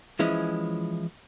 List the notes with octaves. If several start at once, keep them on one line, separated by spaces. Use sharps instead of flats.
E3 F3 G#3 C#4 E4